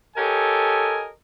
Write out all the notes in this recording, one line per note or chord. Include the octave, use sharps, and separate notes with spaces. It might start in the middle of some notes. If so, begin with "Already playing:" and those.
G4 A4 A#4 C#5 D#5 G#5